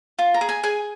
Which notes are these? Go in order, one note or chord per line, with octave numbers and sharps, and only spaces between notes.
F4
A#5
G#4
G#5
G#4 G#5